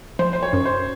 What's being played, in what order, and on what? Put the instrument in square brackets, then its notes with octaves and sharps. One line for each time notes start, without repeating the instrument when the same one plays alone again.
[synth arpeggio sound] F3 [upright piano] C5
[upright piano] C5
C#5
[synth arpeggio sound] F#2
[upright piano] C5